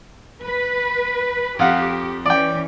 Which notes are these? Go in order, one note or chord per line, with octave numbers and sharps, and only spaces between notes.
B4
F2 G4 F5 F#5
E3 C#4 D5 G5